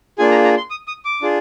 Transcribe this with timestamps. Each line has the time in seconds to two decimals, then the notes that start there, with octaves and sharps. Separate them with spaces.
0.18 A#3 D4 F4 G#4 G#5
0.31 A#5
0.44 A#5
0.57 C6
0.70 D#6
0.87 D#6
1.05 D6
1.22 D4 F4 G#4